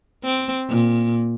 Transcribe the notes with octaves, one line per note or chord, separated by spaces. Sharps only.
C4
A#2